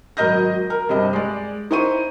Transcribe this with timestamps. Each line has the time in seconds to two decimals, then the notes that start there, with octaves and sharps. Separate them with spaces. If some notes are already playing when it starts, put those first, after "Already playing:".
0.17 G#1 F#3 A#4 D#5 G6 A#6
0.70 A#4
0.89 G2 C3 D#5
1.13 G#3 D5
1.71 D#4 E4 C5 C#6 D#7